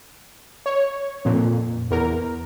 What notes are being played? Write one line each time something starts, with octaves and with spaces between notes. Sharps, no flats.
C#5
F2 A#2
E2 A#4